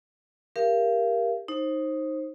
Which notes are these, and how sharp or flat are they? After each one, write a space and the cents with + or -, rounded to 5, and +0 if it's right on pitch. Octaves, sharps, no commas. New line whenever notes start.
G4 +15 A#4 +10 F5 -35
D#4 +0 C5 +25